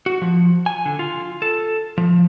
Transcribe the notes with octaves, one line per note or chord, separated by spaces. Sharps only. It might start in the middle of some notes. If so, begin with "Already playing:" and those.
F#4
F3
G#5
D3
F4
A4
F3